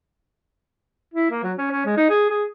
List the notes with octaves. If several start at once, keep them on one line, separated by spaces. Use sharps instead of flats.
E4
A#3
F#3
C#4
C#4
G#3
D#4
G#4
G#4